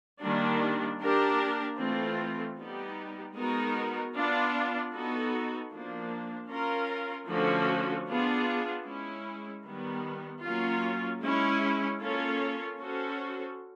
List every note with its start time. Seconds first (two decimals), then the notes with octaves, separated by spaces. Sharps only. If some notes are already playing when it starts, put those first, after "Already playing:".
0.21 D#3 G3 A#3 D4
1.00 A#3 D4 G4 A#4
1.78 E3 A3 C4 F4
2.57 G3 B3 D#4 G4
3.36 G#3 B3 D#4 F#4 A#4
4.14 B3 D4 F4
4.92 B3 D#4 F#4 A4
5.71 F3 A#3 D4
6.49 C#4 F4 A#4
7.28 D3 F3 A3 C#4 F#4
8.08 B3 D4 F4 G#4
8.85 G#3 C#4 E4
9.64 D#3 G3 B3
10.42 F#3 A#3 C#4 F4
11.21 G#3 C#4 E4
12.00 A#3 C#4 F4 A4 C#5
12.78 C#4 F#4 A4 C5